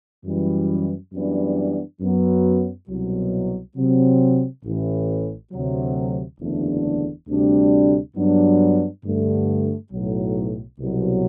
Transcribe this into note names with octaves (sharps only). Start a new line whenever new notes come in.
F#2 E3 G3
F#2 E3 G3 B3 D4
F#2 F#3 B3
C2 B2 F#3
C3 F#3 C4
A1 A2 E3
D2 C3 F#3
F#1 E2 D3 A3 D4
D2 C3 G3 D4
G2 F#3 B3 D4
G2 D3 A3
B1 A2 F#3
C2 B2 F#3